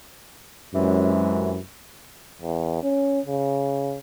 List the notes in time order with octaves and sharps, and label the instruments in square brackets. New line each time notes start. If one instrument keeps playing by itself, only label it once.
[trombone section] F#2 [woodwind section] C3 E3 G#3
[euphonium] E2
C#4
C#3